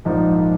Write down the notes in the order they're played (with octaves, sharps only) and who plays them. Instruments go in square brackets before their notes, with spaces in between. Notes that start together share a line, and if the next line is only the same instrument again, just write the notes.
[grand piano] A#1 G#2 F3 A#3 D#4